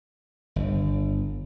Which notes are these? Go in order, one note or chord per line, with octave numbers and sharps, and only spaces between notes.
G1